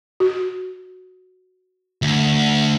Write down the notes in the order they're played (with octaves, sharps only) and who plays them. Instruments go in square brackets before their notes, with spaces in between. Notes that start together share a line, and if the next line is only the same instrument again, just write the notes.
[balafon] F#4
[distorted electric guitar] D2